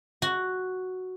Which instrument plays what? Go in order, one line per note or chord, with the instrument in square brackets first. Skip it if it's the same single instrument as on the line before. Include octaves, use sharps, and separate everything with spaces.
[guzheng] F#4